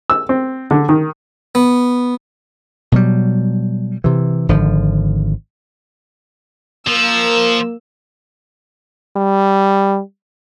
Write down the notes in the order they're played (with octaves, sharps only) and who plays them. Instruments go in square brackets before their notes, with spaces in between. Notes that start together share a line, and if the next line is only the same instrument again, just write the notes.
[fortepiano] E6
C4
D3
D#3
[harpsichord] B3
[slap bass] B2 F#3 G3
C3 E3
G#1 D3 F3
[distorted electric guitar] F3 [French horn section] A#3 [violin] E6
[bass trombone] G3